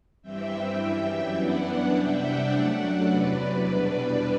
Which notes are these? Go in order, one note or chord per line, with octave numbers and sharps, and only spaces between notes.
G2 E3 G3 C4 E5 G5
F#2 E3 G3
E5 G5
F#2 E3 B3 D4 D5 F#5
C3 G3 D4 E5 G5
D5 F#5
F#2 F#3 A3 D4
E2 C3 F#3 B4 D5
E2 B2 G3 D4 B4 D5